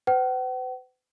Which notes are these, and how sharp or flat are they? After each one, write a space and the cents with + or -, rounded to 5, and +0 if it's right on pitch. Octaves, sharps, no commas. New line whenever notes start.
B4 +45 F#5 +45